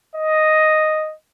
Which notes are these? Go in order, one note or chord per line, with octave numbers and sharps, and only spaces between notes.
D#5